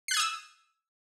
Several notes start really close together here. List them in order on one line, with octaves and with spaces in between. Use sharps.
C7 F#6 G#6 D#6 E6